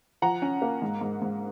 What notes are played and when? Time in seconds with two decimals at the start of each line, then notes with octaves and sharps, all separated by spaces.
0.22 F3 F#5 A#5
0.42 C#4
0.62 A#3
0.82 G#2
1.01 G#2
1.22 G#2